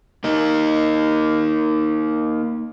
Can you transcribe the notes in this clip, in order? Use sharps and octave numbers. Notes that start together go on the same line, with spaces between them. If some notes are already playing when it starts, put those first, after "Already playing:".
A#3 D#4